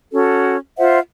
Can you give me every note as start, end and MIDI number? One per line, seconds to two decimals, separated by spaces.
0.12 0.57 61
0.12 0.57 66
0.12 0.57 69
0.79 0.99 65
0.79 0.99 72
0.79 0.99 76
0.79 0.99 78